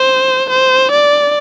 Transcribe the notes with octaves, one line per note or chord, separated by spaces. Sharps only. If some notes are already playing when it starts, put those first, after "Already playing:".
Already playing: C5
C5
D5